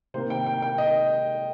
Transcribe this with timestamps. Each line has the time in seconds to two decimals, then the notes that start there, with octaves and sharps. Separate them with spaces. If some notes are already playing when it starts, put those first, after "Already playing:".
0.14 C3 D#3 A#3 C5
0.30 G5
0.46 G5
0.62 G5
0.78 D#5